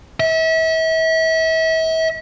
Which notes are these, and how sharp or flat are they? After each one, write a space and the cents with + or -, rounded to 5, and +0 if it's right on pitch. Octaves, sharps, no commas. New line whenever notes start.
E5 -35